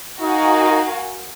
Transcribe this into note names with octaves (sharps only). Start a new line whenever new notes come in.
D#4 F#4 A#4 F5 G#5